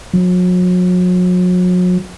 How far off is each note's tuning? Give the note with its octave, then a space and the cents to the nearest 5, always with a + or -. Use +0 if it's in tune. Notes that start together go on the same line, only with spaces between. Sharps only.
F#3 -40